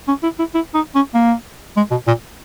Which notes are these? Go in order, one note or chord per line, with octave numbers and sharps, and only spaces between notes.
C#4
E4
E4
E4
D#4
C#4
A#3
G#3
B2
A#2